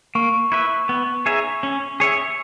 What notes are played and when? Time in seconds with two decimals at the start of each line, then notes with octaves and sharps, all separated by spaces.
0.15 A#3 C#6
0.52 E4 B4 E5
0.89 B3
1.26 D#4 G#4 C#5 E5
1.63 C#4
2.00 G#4 C#5 E5